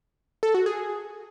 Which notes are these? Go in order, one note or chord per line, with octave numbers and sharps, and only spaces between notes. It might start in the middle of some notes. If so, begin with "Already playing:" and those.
A4
F#4
G#4